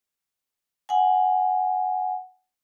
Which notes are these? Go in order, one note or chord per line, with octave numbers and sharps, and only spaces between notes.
F#5 G#5